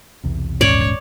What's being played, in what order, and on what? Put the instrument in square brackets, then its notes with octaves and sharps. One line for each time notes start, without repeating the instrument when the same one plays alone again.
[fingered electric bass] B1 E2 C3
[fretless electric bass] D#1 G#2 C#4 [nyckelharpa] C#5 [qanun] D5